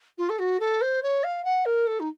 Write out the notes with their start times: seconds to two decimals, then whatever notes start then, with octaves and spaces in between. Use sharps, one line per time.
0.18 F4
0.29 A4
0.39 F#4
0.60 A4
0.81 C5
1.02 C#5
1.23 F5
1.44 F#5
1.65 A#4
1.87 A4
2.00 D#4